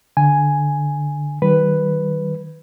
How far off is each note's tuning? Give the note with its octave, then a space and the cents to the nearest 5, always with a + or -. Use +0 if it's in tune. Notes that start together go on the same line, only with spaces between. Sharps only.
D3 +0 G#5 +0
D#3 +0 G3 -45 B4 +0